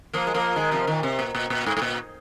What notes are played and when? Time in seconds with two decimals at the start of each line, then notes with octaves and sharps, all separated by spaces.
0.13 F3 A#3
0.27 G#3
0.34 F3 A#3
0.56 D#3 G#3
0.71 C3 F3
0.87 A#2 D#3
1.03 C3
1.19 A#2
1.35 A#2
1.50 A#2
1.66 G#2
1.77 G#2
1.82 A#2